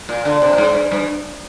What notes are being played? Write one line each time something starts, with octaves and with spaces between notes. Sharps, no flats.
A#2
D3
C3
A#2
G#2
G2
G2